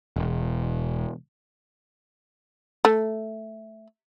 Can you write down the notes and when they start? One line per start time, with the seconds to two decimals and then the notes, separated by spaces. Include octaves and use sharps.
0.16 E1
2.85 A3